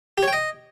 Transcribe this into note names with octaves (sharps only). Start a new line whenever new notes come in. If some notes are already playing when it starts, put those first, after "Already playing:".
G4
C#5
G5
D#5